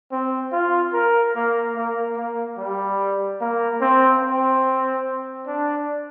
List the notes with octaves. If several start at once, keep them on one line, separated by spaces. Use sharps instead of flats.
C4
F4
A#4
A#3
A#3
A#3
G3
A#3
C4
C4
D4